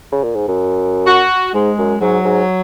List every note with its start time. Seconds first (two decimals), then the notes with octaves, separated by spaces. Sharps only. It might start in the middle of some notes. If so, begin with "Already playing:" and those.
0.12 C#3
0.24 A#2
0.35 G#2
0.48 F#2
1.07 F#4
1.54 G#2 G#3
1.78 F#2
2.01 G#2 F#3
2.25 G#2